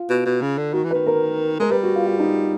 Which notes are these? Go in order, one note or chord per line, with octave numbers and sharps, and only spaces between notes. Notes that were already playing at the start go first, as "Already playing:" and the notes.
Already playing: F4
B2
B2
C#3
D3
D#3 F#4
E3
B4
D#3
A#4
G#3 A#4
G3 B4
F#4
F4
F4
D#4